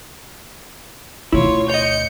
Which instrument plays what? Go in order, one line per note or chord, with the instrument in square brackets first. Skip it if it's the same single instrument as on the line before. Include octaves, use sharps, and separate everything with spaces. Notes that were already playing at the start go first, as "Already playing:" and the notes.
[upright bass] D2 B2 [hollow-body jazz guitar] E4 [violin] F4 C#5
[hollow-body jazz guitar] C#5 D#5 [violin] G6 C#7